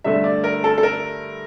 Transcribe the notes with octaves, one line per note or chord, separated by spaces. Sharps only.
G2 D3 A3 E5
D5
A#4
A4
A4
A#4